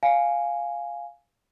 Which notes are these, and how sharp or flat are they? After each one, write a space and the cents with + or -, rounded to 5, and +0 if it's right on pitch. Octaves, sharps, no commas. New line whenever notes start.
F5 +0 G#5 +0